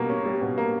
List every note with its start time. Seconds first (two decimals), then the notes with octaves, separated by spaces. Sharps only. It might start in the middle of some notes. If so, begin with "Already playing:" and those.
Already playing: B2 G3 A#3
0.09 C#4
0.25 G3
0.41 B2
0.58 A#3